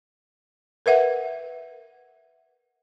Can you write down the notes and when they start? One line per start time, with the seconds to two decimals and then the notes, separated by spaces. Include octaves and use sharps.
0.86 A#4 B4 E5 F#5